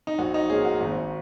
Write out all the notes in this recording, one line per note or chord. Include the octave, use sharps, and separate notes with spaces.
D#4
A#1 F#4
D#4
A#2 A#3 C#4 G#4
F#4
G#1 F#4